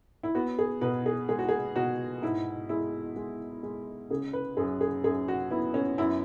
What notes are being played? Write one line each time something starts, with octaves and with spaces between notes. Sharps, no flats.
E4
B3 F#4
G#4
B2 B4
G#4
G#3 G#4
F#4
G#4
B2 F#4
G#2 E4
G#3 E4
G#3
G#3
C#3 G#4
B4
F#2 G#4
G#4
F#2 G#4
F#4
B3 E4
C#4
F#2 E4